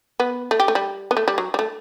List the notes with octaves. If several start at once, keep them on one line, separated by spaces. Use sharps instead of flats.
B3
A3
G4
A3
G3
B3
A3
G3
F#3
G3
A3